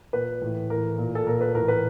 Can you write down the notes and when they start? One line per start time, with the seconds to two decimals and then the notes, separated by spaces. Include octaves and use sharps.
0.13 A#2 B4
0.42 A2 E3
0.70 A2 E3 A#4
0.98 A#2
1.15 A4
1.27 A#2 A#4
1.41 B4
1.55 A2 E3 A#4
1.68 B4